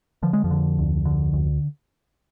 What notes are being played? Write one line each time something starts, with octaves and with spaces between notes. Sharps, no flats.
D3 F3
G#3
F2 F3
D3
D2
D3
D2